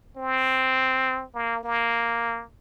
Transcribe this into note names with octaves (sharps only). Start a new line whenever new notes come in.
C4
A#3
A#3